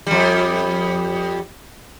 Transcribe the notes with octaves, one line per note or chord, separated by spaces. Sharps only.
F2 G3